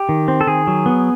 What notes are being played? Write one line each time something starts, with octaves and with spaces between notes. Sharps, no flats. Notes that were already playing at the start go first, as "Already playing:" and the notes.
Already playing: G4
D#3
C4
A4
D#3 G#4
F#3
B3